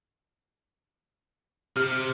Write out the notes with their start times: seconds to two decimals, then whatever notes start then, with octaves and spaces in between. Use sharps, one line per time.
1.76 C3 G4 F6